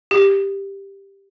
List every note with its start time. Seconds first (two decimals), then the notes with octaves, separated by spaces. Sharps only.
0.11 G4